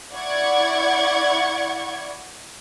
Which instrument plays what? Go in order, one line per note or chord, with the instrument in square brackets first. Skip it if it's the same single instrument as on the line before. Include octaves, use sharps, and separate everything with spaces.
[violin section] E4 D5 F#5 C#6 G#6